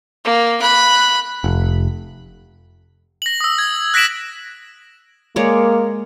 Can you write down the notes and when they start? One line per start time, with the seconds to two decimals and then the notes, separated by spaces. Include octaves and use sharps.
0.24 A#3
0.61 B5 F#6
1.44 F1
3.22 A#6 F#7
3.41 D#6 E6
3.58 G#6
3.94 F#6 A#6 B6 D7 E7 F#7
5.36 G#3 A#3 C#5 D5